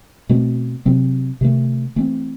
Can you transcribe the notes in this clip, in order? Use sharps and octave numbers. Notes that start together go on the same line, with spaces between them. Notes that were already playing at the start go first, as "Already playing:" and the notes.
B2 A3 C4
C3 F#3 C4
C3 D#3 A3
E3 A3 C4